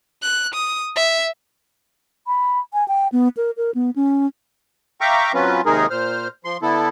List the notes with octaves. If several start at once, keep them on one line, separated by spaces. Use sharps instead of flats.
F#6
D#6
E5
B5
G#5
G5
B3
A#4
A#4
B3
C#4
E5 F5 G5 A#5 C#6 D6
F#3 C4 C#4 F4 B4
D#2 C3 G#3 D#4 G#4 A#4
A#2 C5 F6
F3 C6
D3 B3 E4 A4